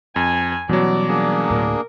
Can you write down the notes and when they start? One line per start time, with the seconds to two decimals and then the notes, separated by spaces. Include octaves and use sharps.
0.16 F2 G#5
0.69 B2 E3 F#3 G3 C#4 D5
1.08 A#3 D4 G#4
1.50 D2 A2 A#4